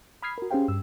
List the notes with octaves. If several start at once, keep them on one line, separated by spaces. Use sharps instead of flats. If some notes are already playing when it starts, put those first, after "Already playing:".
B5 D#6 F6 G#6 B6 C7
F#4 A#4
C#4 G4 G#4 C5 F5 G5
G2 E6